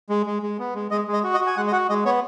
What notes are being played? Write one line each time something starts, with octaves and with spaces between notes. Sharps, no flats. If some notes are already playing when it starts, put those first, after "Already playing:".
G#3
G#3
G#3
B3
G#3
G#3 D#5
G#3
D#5
F#4
D#5
F#4
G#5
G#3 F#5
D#5
F#4 F#5
G#3 D#5
B3 C#5